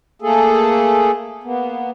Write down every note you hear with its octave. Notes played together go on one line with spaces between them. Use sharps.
A3 A#3 G#4 A4
A#3 B3